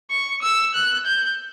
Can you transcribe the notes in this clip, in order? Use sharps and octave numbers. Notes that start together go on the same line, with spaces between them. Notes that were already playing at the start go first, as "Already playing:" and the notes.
C#6
E6
F#6
G6